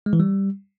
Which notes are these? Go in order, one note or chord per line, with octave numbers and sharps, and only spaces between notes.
G#3
E3
G3